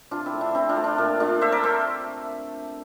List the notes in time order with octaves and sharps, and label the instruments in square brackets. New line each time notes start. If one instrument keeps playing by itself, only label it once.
[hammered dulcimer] C3 D4 F4
C4 E4
A3
D4
E3 C4 E4
D4 F4
A3
D4
A#2 D4
A3 D4 F4
A3 C5 E5
A#4 D5
A3 A4 C5